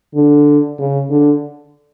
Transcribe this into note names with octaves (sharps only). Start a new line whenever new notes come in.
D3
C#3
D3